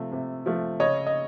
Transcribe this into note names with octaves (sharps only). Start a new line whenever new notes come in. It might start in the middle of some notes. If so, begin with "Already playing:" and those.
Already playing: C3 F3 A3
C3
F3 A3
C#3 C#5 D#5
D#5